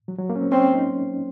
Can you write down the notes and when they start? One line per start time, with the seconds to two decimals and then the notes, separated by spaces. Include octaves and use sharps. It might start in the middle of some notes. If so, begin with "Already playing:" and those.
0.08 F#3
0.19 F#3
0.30 A#3
0.36 C#4
0.41 C4
0.52 C4 C#4
0.74 D#4